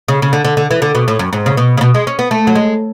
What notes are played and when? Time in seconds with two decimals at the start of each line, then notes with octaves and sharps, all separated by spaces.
0.08 C#3
0.22 C#3
0.33 D3
0.45 D3
0.57 D3
0.71 E3
0.82 D3
0.95 B2
1.08 A2
1.19 F#2
1.33 G#2
1.46 C#3
1.57 B2
1.77 C#3
1.81 B2
1.94 G#3
2.07 C#4
2.19 B3
2.31 A3
2.47 F#3
2.55 G#3